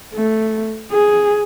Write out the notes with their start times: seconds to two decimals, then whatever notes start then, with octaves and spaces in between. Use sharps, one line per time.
0.14 A3
0.92 G#4